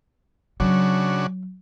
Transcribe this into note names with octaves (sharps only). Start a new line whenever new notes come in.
C#3 F#3 D4 F#4